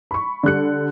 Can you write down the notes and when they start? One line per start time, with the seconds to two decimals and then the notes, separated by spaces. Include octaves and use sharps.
0.11 B5 C#6
0.43 D3 G3 F#6 C#7